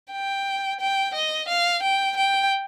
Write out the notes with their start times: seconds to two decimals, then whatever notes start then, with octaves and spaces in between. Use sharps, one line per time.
0.12 G5
0.80 G5
1.14 D#5
1.48 F5
1.83 G5
2.17 G5